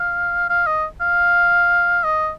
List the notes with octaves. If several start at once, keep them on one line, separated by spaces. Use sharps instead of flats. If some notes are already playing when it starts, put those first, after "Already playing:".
Already playing: F5
F5
D#5
F5
D#5